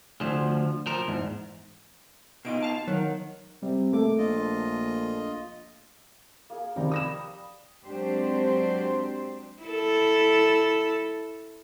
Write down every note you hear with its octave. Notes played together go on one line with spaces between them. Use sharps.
D2 F3
F3 A#4
E2 G#2
B2 D#4 F4 D7
F5 A5
D#3 F#3
C3 G3
A3 A#3 D6
A#1 F4 D#5
A#3 G#4
C3 D#3 F3 G3 G5 A#5
G4 B4 D#6 A#6 E7
A#5
F#3 G#3 C4 D4 G4 C5
E4 A4